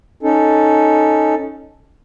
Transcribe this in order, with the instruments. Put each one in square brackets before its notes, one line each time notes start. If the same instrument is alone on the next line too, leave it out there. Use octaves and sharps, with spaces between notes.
[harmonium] C#4 D#4 A4